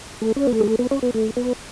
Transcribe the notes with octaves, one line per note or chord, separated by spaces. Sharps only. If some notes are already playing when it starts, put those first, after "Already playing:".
A3
C#4
B3
A3
G#3
A3
B3
C#4
B3
A3
B3